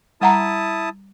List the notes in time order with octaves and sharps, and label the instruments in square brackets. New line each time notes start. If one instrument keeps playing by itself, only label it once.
[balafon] G3 F#5 A#5 [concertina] E4 A5 D#6